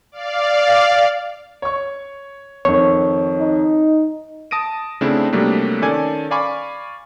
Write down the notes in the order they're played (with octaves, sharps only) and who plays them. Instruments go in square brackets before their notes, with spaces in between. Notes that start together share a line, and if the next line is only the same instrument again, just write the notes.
[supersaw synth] D5 F5
[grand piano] C#5 C#6
[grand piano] F2 D#3 [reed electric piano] C#5
[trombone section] D#4
[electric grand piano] A5 D#6 A#6 D7 D#7
C#3 A3 C4 D4 E4
C3 F#3 G3 A3 A#3 D4
D#3 C#4 A4 D5 G#5 G#6
D5 F5 G#5 B5 C#6 D6